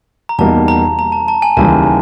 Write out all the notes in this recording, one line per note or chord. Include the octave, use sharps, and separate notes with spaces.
A#5
E2 B2 G3 A#3 D#4 A5
A#5
A#5
A5
A5
G#5
D#2 C#3 E3 G3 A5